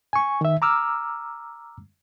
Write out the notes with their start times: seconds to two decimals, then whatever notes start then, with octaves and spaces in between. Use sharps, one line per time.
0.13 G#5 C#6
0.41 D#3 E5
0.62 A#5 D6 E6 F6